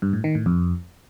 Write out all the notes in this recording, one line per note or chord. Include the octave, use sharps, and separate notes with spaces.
G2
A2
D#3
A2
F2